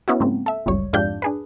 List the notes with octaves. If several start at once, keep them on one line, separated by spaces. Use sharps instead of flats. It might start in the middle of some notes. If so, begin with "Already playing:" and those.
B3 C#4 E4 F#4
G#2 C#3 A#3 C4
A4 E5
G1 C#2 F#2 G3 C#5
F2 G#2 D4 F4 G4 G6
D4 G#4 B4